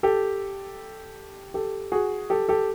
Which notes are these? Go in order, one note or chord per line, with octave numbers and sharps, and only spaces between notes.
G4 A4
G4 A4
F#4 G#4
G4 A4
G4 A4